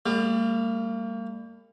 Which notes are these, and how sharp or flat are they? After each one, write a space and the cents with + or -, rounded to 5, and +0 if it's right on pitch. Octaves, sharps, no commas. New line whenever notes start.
G3 +35 A#3 -35